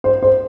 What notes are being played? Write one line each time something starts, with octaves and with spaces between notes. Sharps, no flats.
C5
C5